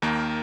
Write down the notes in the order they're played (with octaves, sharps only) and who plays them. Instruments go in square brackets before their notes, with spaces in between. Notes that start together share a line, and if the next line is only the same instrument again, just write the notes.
[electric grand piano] D#2 D#3 A#3